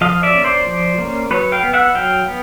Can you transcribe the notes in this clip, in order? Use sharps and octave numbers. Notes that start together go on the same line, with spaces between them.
F3 D#5 F5
D5 E5
A#3 C#4
C5 D5
F3
A#3 C#4
F#3 B4 C#5
F5 G5
B3
E5 F#5
F#3 F5 G5
B3